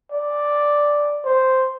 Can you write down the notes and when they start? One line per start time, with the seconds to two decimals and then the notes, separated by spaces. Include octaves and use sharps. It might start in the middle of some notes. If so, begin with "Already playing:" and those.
0.12 D5
1.25 C5